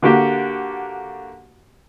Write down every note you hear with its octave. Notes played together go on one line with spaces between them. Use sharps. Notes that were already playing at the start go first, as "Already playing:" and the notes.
D3 A#3 F#4 G4